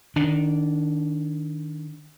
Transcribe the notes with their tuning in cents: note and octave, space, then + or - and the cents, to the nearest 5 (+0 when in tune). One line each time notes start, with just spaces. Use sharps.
D#3 +0 D4 -15